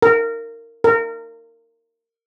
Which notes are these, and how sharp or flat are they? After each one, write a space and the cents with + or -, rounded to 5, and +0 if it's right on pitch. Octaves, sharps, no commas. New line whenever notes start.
A#4 -20
A#4 -25